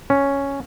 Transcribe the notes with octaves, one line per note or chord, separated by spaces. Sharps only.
C#4